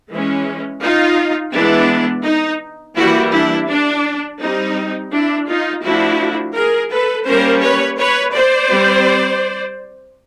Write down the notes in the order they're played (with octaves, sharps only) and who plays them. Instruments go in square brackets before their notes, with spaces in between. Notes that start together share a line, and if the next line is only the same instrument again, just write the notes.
[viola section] E3 G#3 C#4
D#4 F4
E3 G#3 B3 D4 E4
D#4
E3 G3 A#3 E4 F#4
D4 E4
D4
G3 C4 D#4
D4 E4
D#4 F4
F3 A3 D4 E4 F#4
G#4 A#4
A4 B4
G3 A#3 C#4 A#4 C5
B4 C#5
B4 C#5
C5 D5
G3 C4